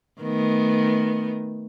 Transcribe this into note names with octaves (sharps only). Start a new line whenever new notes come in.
D#3 A3 B3